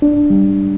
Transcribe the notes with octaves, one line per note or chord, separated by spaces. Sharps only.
D4
G3